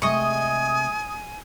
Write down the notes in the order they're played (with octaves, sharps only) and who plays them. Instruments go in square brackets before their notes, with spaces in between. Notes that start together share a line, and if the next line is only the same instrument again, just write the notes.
[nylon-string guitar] C3 G#3 A3 [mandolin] D#5 C#6 [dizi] G#5 [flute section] D#6